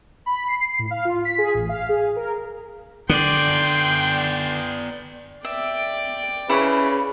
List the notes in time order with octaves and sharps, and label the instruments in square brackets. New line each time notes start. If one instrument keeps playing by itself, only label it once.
[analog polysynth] B5
C7
C7
A2
F5
F4
B6
G#4
A1
F5
G#4
A#4
[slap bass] D3 [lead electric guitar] B3 D5 [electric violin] G5 C6
[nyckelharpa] D5 G5 [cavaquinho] E5
[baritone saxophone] C#3 [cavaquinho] E4 B5 C#6 [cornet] B4